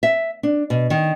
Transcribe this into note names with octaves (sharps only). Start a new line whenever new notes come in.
E5
D4
B2
D#3